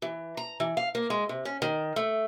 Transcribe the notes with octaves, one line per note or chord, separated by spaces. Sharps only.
E3
A#5
E3
F5
A#3
G#3
C3
C#4
D#3
A3